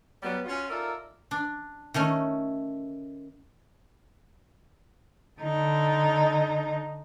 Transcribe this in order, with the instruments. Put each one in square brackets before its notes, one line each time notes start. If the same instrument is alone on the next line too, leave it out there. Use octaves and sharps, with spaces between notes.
[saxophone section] F#3 G3 B3
C#4 F4 F#4
D#4 F4 A4 A#4 D5 E5
[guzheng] D4
D#3 A3 C#4
[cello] D3 D#4